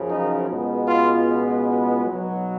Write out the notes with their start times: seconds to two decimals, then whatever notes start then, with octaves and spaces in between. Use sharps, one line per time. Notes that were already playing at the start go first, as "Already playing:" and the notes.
Already playing: F#2 C#3 F3
0.10 D#4
0.50 C#2 B2 G#3 B3
0.88 F4
2.04 B1 B2 F#3